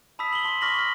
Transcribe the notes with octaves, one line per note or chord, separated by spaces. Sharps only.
A5 B5 D#6 E6 B6
F#7 G7
A5 C6
C#6 D6 F6 A#6 B6 F#7
F6